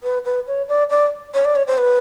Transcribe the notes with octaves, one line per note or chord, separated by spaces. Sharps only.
B4
B4
C#5
D5
D5
C#5
D5
C#5
C5
B4